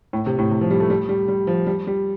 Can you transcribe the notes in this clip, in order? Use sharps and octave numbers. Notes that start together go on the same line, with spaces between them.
A2
C3
A2
C3
F3
G3
A3
G3
G3
G3
F3
G3
G3